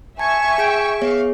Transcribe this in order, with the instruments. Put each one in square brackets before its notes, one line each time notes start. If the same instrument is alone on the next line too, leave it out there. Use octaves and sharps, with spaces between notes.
[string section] E5 C#6 [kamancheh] G#5 [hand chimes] A5 [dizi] G#6
[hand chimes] G#4 G#6 D7 [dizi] G5
[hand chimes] B3 G#4 C#5 [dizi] F5